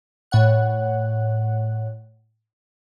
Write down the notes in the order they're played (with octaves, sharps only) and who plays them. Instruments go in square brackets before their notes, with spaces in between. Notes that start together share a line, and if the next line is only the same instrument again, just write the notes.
[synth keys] A2 C#5 F#5 F#6